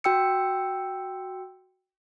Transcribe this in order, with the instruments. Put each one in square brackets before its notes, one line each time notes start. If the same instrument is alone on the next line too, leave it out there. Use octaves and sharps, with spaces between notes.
[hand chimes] F#4 G5 E6 C#7